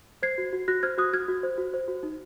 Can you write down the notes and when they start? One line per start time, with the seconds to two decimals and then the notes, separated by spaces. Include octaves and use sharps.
0.22 C5 G#6 C7
0.38 F#4
0.53 F#4
0.68 F#4 F#6 A#6
0.83 C5 F6 G#6
0.98 F#4 D#6 F#6
1.13 F#4 F6 G#6
1.28 F#4
1.43 C5
1.58 F#4
1.74 C5
1.88 F#4
2.03 D#4